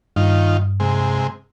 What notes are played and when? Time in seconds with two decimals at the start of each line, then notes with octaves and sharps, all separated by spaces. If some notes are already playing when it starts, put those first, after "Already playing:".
0.16 G2 D#3 F4
0.80 C3 G#3